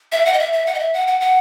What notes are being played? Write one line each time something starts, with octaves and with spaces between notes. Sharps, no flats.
E5
F#5
D#5
E5
E5
F#5
D#5
E5
F#5
F#5
F#5